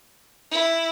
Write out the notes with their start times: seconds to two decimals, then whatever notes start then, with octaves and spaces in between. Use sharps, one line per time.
0.51 E4